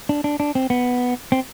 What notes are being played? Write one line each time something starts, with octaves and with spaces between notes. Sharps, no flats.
D4
D4
D4
C4
B3
C4